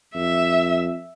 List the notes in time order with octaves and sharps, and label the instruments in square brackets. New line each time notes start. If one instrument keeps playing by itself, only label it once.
[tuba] F2 [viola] E5